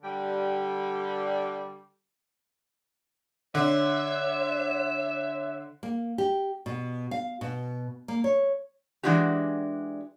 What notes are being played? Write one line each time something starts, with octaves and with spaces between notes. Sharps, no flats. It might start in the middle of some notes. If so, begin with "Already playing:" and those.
D3 G3
D3 C#5 E5
A#3
G4
B2
F5
B2
A#3
C#5
E3 G#3 D4 F#4 G4